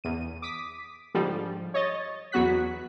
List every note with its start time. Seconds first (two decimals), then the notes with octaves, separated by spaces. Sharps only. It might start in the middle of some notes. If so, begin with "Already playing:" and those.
0.04 E2 D#7
0.42 D6 D#6 B6
1.15 G#2 D3 F3 G3
1.74 C#5 D#5 A6
2.32 E2 F#3 B3 F#4 F#6 B6